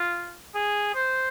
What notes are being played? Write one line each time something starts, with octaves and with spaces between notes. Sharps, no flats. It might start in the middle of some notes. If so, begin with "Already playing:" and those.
Already playing: F4
G#4
C5